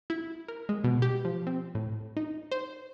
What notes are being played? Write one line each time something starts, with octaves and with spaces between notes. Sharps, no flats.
E4
A#4
G#3
B2
G4
F3
C4
A2
D#4
C5